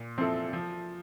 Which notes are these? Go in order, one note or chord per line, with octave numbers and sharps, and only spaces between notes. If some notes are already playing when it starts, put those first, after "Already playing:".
Already playing: A#2
F3 C4 E4 A4
F3